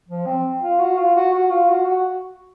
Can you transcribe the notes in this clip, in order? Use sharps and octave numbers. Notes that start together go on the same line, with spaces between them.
F3
C4
F4
F#4
F4
F#4
F#4
F4
F#4
F#4